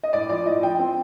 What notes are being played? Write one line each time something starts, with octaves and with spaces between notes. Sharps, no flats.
D#5
A2 D5
F3 D5
A2 D#5
F3 G5
C4